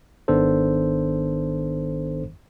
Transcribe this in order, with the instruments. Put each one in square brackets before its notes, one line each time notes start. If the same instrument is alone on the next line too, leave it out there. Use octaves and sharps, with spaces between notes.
[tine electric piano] G#1 D#3 B3 D4 A4 C5